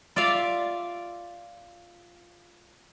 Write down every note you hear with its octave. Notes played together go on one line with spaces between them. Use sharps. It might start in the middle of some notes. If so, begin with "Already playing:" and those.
F4 D5 E5 F5